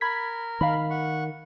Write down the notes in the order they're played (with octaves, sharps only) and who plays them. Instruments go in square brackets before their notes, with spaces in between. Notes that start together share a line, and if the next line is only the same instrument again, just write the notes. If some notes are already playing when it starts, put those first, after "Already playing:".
[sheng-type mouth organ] A#4 [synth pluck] B5 G#6 B6
[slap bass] D#3 [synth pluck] F5 B5
[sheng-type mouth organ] F#5 C#6